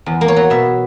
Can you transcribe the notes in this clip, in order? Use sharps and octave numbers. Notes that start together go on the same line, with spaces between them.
E2
A#3
C#5
F#3
B2 E5